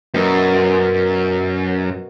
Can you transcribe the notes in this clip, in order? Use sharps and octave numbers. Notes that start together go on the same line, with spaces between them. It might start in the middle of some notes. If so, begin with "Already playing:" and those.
F#2 B2 A#4